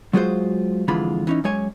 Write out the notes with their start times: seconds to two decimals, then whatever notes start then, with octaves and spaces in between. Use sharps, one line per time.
0.13 F#3 G#3 F4 F#4 G#4 C5
0.88 F2 D3 E3 G#3 F4 B5
1.27 E3 C#4 D#4
1.44 F#2 G#3 C#5 G#5